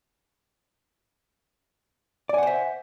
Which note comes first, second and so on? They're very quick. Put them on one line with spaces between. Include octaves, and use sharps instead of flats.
D5 G#5 F#5 C5 E5